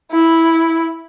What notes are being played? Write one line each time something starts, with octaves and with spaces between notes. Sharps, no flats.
E4